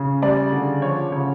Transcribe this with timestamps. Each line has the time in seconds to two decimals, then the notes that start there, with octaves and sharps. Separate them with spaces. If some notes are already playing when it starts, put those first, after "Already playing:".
Already playing: C#3
0.22 G3 D5
0.52 D3
0.82 F3 C#5
1.12 C#3 C#5